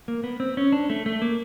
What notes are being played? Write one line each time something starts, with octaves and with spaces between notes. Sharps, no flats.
A#3
B3
C4
C#4
D4
A3
A3
A#3